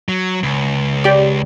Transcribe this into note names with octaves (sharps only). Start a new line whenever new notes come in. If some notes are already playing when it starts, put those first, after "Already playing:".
F#3
C#2
G4 D5